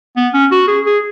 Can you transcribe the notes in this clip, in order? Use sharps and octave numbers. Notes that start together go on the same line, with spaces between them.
B3
C#4
F#4
G#4
G#4